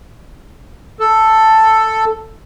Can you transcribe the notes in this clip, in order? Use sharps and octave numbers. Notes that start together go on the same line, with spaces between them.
A4